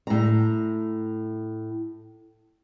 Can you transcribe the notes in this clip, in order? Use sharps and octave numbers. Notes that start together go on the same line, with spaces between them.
A2 A#5